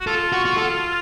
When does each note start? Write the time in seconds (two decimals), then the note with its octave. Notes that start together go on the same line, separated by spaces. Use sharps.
0.01 F#4
0.07 F4 A4
0.32 F#4
0.45 F#4
0.57 A4